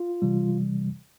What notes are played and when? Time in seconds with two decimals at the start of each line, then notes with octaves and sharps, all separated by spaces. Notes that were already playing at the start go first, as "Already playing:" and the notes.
Already playing: F4
0.22 C3 E3 G3